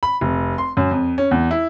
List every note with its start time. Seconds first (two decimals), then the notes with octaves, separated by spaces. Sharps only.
0.03 B5
0.21 F1
0.58 C6
0.77 F#2
0.91 F2
1.18 C#4
1.31 E2
1.51 E4